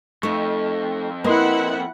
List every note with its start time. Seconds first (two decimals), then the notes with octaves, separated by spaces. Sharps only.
0.23 F2 A3 D#4 C#6
1.24 A#3 E4 B4 D#5 F#5 C6